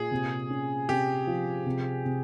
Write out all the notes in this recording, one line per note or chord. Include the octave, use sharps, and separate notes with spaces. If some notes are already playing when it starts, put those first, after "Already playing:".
Already playing: A#2 G#4
C3
C#4
C3 G4
F3
C3
C3